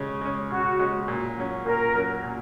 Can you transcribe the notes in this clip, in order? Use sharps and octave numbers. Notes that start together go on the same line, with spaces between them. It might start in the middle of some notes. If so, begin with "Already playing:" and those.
Already playing: C#3 G#3 C#4
G#3 C#4
C#3 F#4
G#3 C#4
A#2
F#3 C#4
A#2 A#4
F#3 C#4
A#2